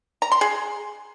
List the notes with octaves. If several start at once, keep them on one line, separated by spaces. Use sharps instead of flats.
A#5
C6
G#4